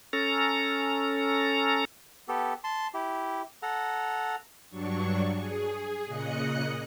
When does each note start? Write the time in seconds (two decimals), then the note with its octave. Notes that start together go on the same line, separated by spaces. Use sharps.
0.13 C#4 A4 A#5
2.28 B3 G4 A4
2.64 A5 C6
2.94 E4 G4
3.63 A4 F#5 A#5
4.70 G2 F#3 D4 C#6
5.33 G#4
6.06 A#2 C#3 D#5 F#6 C#7